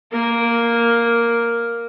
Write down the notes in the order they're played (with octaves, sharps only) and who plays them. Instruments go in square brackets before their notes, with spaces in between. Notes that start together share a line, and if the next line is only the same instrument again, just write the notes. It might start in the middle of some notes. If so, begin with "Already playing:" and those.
[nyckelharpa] A#3 A#4